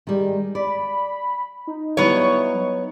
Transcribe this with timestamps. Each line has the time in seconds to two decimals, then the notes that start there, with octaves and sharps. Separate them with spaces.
0.07 D#3 G3 G#3
0.55 D5 B5
1.67 D#4
1.97 F#3 G3 B3 E4 C#5